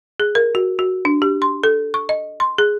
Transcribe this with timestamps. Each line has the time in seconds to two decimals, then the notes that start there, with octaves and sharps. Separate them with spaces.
0.20 G#4
0.35 A#4
0.55 F#4
0.79 F#4
1.05 D4
1.22 G4
1.42 C6
1.64 A4
1.94 C#6
2.09 D#5
2.40 C6
2.58 G#4